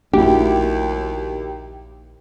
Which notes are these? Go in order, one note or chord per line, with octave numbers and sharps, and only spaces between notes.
A#1 D#2 A3 D4 E4 F#4 G4